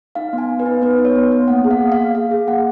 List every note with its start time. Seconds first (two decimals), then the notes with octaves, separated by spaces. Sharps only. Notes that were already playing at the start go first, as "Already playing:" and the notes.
0.15 D#4 F5
0.33 B3
0.38 G#5
0.50 B3
0.60 B4
0.66 D#4
0.82 B3 B4
0.99 D#4
1.05 C#5
1.15 B3
1.32 B3
1.48 A#3 F#5
1.64 G#4
1.71 F5
1.82 A#3
1.92 F5
1.98 A#3
2.15 G#4 F5
2.31 G#4
2.47 A#3 F#5